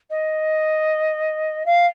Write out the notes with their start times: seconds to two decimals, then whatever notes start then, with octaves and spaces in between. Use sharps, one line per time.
0.10 D#5
1.65 F5